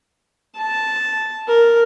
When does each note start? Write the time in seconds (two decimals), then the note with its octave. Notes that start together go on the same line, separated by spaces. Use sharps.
0.56 A5
1.48 A#4